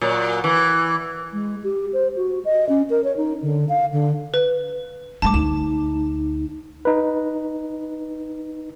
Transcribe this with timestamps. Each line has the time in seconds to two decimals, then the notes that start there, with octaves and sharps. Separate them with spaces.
0.01 A#2 F#3
0.44 E3
1.33 G#3
1.64 G4
1.93 C5
2.17 F#4
2.45 D#5
2.69 C#4
2.90 A#4
3.04 C#5
3.17 D#4
3.42 D3
3.69 F5
3.92 D3
4.34 B4
5.22 G#3 D4 A5 D6
5.34 D2 D#4 E7
6.85 D#4 B4